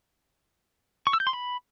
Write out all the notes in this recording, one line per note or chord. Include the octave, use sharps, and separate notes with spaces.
C#6
E6
G6
C6
B5